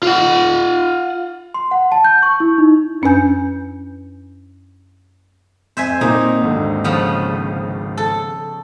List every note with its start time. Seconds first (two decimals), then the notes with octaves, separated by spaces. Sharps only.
0.03 F4 F#5
1.54 C6
1.71 F#5
1.92 A5
2.04 G6
2.23 C#6
2.40 E4
2.58 D#4
3.02 F#2 C#4 D4 B4 G#5 G6
5.77 F2 C5 E5 G#5
6.01 A#2 A#3 C4 D#4
6.41 G#1 D#2 D3
6.84 C#3 F3 B3
7.98 A4